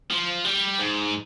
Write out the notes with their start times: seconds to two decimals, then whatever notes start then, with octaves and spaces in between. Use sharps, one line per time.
0.10 F3
0.45 G3
0.78 G#2